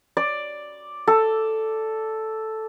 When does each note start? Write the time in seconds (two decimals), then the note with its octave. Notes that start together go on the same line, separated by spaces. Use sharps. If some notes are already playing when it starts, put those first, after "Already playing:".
0.17 D5
1.07 A4